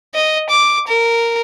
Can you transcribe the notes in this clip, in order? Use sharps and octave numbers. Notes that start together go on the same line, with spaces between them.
D#5
D6
A#4